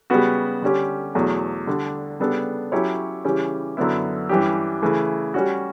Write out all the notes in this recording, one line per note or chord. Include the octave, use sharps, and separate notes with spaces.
C#3 G3 B3 F#4
D3 G3 C#4 G4
E2 B2 F#3 A3
D3 G3 D4
C#3 G3 B3 D4 A4
F#3 C#4 E4 G4 C#5
C#3 E3 G3 C#4 G4
F#2 D3 F#3 B3 E4
G2 E3 G3 C#4 G4
C#3 E3 A3
G3 C#4 F#4